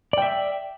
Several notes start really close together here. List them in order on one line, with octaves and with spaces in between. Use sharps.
D5 G5 E5